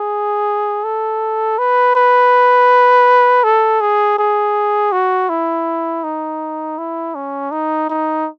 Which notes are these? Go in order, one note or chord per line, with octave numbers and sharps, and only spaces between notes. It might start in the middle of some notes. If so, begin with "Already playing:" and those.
Already playing: G#4
A4
B4
B4
A4
G#4
G#4
F#4
E4
D#4
E4
C#4
D#4
D#4